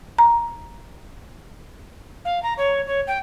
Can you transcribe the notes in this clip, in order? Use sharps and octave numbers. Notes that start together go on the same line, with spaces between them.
A#5
F5
A#5
C#5
C#5
G5